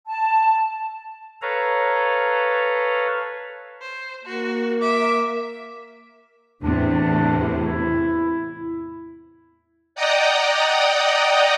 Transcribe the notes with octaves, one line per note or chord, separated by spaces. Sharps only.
A5
A4 B4 C#5 F5 A#5
C5
A#3 F#4
E5 D6
E2 A2 C3 D4
E4
D5 D#5 F#5 G5 A#5 D#6